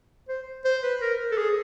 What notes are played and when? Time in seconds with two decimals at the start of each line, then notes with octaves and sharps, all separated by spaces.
0.28 C5
0.64 C5
0.83 B4
1.01 A#4
1.31 A4
1.37 G#4